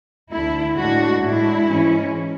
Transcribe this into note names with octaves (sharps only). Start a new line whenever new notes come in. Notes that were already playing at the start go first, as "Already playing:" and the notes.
D2 D3 A3 E4
A2 G#3 D4 F#4
A2 G#3 D4 E4
G#2 E3 G#3 C#4